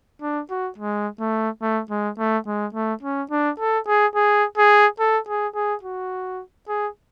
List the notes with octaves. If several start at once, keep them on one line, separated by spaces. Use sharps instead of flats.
D4
F#4
G#3
A3
A3
G#3
A3
G#3
A3
C#4
D4
A4
G#4
G#4
G#4
A4
G#4
G#4
F#4
G#4